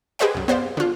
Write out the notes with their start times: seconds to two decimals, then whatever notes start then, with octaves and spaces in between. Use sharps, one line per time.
0.19 G4 G#4 B4 C5 D#5 F#5
0.35 C2 F#2
0.48 B3 C5 D5 F5
0.77 D3 F4